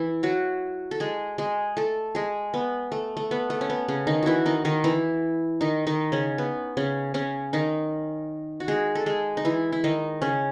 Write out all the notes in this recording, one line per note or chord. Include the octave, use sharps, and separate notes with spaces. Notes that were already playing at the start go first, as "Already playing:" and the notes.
Already playing: E3 E4
F#3 F#4
A4
G#3 G#4
G#3 G#4
A3 A4
G#3 G#4
B3
A3
A3
B3
A3
C#4
B3
C#3 C#4
D#3 D#4
E3 E4 F#4
D#3 D#4
D#3 D#4
E3 E4
D#3 D#4
D#3 D#4
C#3 C#4
B3
C#3 C#4
C#3 C#4
D#3 D#4
F#4
G#3 G#4
A4
G#3 G#4
D#4
E3 E4
E4
D#3 D#4
C#3 C#4